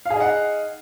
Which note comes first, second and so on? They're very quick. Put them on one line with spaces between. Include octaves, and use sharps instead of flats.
F5 G#4 D#4 F#5